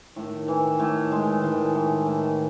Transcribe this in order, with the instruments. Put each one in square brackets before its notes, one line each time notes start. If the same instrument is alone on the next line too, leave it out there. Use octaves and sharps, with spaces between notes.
[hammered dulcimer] A2 [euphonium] D#3
[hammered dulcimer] E3
A2
G#3
[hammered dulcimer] A2 [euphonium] D#3
[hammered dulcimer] E3
A2